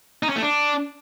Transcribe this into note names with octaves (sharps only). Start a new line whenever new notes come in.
D#4
C#4
A3
D4